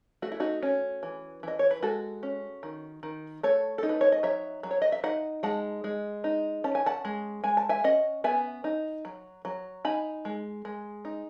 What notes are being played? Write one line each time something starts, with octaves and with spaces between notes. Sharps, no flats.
A3 F#4
E4
D#4 F#4
C#4
E3
E3 D#5
C#5
B4
G#3 F#4 A4
C#4
D#3
D#3
A3 A4 C#5
D#4 A4
B4
C#5
D#5
F#3 C#5 E5
F#3
C#5
D#5
E5
D#4 D#5 F#5
G#3 F#5 A5
G#3
D#4
C#4 A5
G#5
F#5 A5
G#3
G#3 G#5
A5
E5 G#5
C#4 D#5 F#5
B3 E5 G#5
D#4
F#3
F#3
D#4 G#5 B5
G#3
G#3
D#4